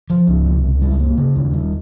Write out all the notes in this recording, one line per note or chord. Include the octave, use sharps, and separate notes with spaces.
F3
C#2
C3
C#2
G3
A#3
C#3
D#2
G3